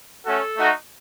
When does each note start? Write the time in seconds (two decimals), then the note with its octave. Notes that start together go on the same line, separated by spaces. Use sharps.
0.25 A3 C#4 F#4 A4
0.57 A3 D#4 F#4